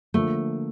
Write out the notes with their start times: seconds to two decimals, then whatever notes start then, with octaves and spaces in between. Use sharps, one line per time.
0.14 D3 F3 A3 A#3